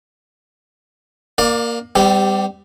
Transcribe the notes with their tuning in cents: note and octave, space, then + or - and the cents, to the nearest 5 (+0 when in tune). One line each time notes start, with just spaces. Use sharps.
A#3 +0 D5 +20 F5 +35
G3 +15 C4 -45 G4 +0